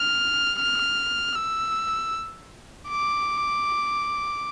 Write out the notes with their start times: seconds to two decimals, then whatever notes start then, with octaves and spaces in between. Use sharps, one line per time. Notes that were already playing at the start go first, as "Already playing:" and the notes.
Already playing: F6
0.59 F6
1.35 E6
2.88 D6